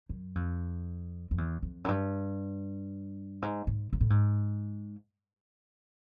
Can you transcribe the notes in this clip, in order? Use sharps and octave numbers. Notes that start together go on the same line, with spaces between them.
F#2
F2
F2
E2
F2
F#2
G2
G#2
G#2
G#2
A2
G#2